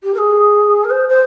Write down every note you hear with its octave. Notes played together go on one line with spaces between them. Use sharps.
G4
A#4
G#4
A#4
C5
C5